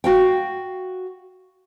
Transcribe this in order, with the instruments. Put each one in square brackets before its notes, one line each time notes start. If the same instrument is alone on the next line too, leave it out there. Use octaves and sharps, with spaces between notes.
[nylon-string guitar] F#4 F5 G5